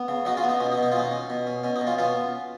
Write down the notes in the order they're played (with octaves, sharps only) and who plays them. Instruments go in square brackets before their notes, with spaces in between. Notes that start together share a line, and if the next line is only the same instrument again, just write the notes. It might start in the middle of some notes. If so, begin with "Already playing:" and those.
Already playing: [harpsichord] B3
C#3
C#3 D#4 F#4
C#4 F4
B3
D#4
B2 C#4
D#4
B2
D#4
F4
C#4 D#4
C#4
B2
C#4
B2 C#4
D#4
B2
C#4 F4
B3 C#4 F4